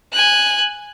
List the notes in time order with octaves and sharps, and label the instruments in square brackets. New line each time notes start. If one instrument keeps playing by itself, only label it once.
[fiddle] G#5 F#6